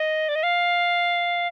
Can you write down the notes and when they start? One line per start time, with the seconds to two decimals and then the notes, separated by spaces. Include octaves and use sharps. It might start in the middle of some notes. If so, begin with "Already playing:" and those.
Already playing: D#5
0.29 D5
0.35 D#5
0.43 F5